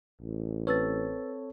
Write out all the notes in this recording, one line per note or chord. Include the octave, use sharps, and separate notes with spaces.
A1
C4 A4 B4 C#5 E6 A6